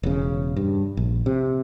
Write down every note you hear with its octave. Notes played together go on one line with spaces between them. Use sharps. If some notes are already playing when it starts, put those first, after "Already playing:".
E1 C#3
G2
A#1
C3